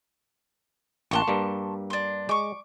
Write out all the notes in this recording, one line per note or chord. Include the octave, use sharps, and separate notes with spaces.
A1 A#3 F#5 A5 C6 C#6
G2 G3 A#3
D4 C6
G#3 C#6 D6